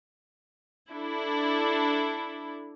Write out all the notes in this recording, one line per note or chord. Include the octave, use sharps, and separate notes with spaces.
D4 E4 A4